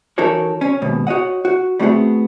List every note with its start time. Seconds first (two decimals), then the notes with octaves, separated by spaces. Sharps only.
0.18 E3 D#4 F#4 A4 A#4 C#5
0.61 C#4
0.82 D#2 G#2 B2
1.07 F#4 C#5 D#5 F#5
1.45 F#4
1.80 G3 A3 B3 C4 F#4 G#4